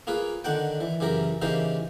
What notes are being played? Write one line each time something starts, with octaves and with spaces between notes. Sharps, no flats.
A#3 F4 G#4 B4
D3 D#3 D4 F#5 G5
E3
F#2 C#3 E3 G4 A#4
C#3 E3 A#3 D#4 G4 C5